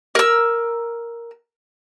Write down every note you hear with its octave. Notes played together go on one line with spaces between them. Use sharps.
A#4 E6